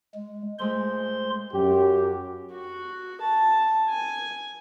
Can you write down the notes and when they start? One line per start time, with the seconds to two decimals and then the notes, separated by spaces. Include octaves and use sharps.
0.15 G#3
0.59 A#2 G#3 A3 C5 C6
1.54 F#2 G4
2.51 F#4
3.21 A5
3.89 G#5